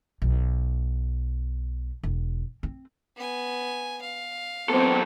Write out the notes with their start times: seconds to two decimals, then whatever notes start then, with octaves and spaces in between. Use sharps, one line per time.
0.22 B1
2.03 E1
2.63 C4
3.16 B3 G#5
4.02 F5
4.69 F#2 B3 C4 A4